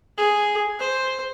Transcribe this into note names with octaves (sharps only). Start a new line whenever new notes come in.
G#4
C5